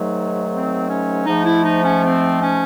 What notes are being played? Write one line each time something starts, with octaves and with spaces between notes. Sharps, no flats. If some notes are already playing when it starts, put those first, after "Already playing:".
Already playing: G#2 D#3 F#3 A3
C4
C#4
G#2 F3 A3 D#4
E4
D#4
C#4
C4
C#4